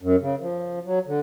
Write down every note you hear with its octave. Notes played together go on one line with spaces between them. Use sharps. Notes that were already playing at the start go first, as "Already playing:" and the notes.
F#2
C#3
F3
F#3
D3